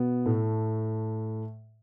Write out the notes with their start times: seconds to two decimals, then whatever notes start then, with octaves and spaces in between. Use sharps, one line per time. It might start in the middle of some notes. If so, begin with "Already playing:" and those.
Already playing: B2 B3
0.26 A2 A3